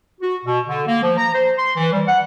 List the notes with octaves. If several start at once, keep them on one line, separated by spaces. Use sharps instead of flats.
F#4
B2
D3
A#3
F3
A#5
C5
C6
E3
G3
F#5